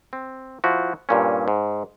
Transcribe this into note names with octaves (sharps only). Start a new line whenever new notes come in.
C4
F3 E4 F#4
G2 A#2 C#4
G#2